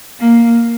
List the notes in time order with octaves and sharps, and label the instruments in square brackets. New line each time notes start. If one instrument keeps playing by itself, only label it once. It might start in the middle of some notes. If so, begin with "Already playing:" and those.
[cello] A#3